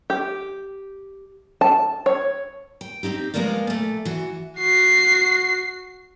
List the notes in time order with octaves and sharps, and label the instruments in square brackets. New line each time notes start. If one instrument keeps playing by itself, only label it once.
[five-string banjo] G4
A5
C#5
[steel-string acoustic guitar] G5
C4 D4 D#4 G4
F3 G#3 A#3 B3 A#4 D5
A#2 A3
E3 F#4
[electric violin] F#4 C7